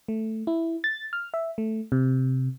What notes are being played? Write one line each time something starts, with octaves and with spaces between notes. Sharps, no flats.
A3
E4
A6
F6
E5
A3
C3